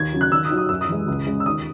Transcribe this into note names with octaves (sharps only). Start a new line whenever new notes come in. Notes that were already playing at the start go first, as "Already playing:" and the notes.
Already playing: D#2 G#6
C#3 F#3
F#6
D#2 E6
D#6
D#3 F#3
D#6
F#2 E6
D#6
E3 G#3
C#2
C#3 G#3
E6
D#2 D#6